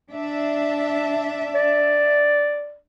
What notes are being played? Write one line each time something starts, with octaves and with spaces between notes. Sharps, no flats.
D4 E5
D5